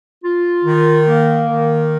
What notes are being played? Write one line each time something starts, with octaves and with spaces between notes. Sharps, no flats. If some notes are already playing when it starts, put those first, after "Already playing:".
F4
D#3
A#3
D#3